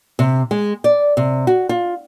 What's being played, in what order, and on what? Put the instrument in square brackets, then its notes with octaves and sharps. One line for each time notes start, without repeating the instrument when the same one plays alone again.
[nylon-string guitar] C3
G#3
D5
C3
F#4
F4